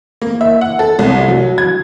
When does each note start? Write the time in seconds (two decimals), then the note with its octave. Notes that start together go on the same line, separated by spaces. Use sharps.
0.22 A#3
0.41 E5
0.61 F#5
0.79 A4
0.99 C2
1.28 F#3
1.58 G#6